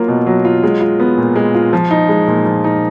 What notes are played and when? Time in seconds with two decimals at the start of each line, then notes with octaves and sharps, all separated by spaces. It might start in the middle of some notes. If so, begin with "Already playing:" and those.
Already playing: F#3 A#3 F4
0.08 B2
0.27 F#3
0.45 F4
0.63 G#3
0.81 F4
1.00 B3
1.18 A#2
1.36 G#3
1.55 F4
1.73 F3
1.91 D#4
2.09 G#3
2.28 A#2
2.46 F3
2.64 D#4